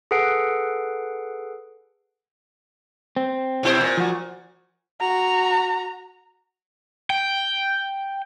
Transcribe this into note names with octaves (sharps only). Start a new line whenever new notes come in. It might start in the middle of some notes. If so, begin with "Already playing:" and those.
G#4 A4 B4 F#5 C7 D7
C4
B2 E4 C5
A#2
F3 F#4
F#4 A#5
G5